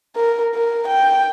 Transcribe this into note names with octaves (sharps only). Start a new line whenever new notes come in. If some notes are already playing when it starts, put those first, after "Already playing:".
A#4
A#4
G5